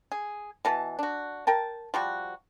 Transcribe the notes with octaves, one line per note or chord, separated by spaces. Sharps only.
G#4
B2 E3 A5
D4 F#4
A#4 G5 A5
F3 G3 F#4